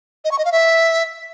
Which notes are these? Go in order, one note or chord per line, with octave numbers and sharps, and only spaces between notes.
D#5
C#6
D#5
F5
E5